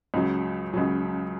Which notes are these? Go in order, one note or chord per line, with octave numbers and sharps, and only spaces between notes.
C#2 C#3 F#3
C#2 C#3 F#3